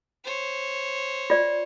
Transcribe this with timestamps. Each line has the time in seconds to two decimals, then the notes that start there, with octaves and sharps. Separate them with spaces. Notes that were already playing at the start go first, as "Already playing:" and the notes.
0.24 C5 C#5
1.30 F4 D5